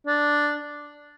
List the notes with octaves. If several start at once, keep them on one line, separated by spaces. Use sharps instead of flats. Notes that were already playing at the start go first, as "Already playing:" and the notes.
D4